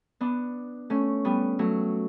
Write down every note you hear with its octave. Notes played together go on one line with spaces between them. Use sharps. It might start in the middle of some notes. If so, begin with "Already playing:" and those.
B3 D4
A3 C#4
G3 B3
F#3 A3